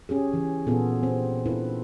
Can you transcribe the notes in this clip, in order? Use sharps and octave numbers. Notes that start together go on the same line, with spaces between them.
C#4 G4 G#4
E3
A#2 B3 F4 G#4 A4
C4
C4 D4 E4 F4 A4 B4